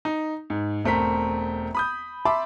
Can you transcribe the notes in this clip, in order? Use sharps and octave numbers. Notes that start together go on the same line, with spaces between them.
D#4
G#2
E1 A3 C4 A#4 B6
B5 D#6 G6
E5 A5 B5 C6 D6